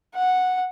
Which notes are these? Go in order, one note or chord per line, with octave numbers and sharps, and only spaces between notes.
F#5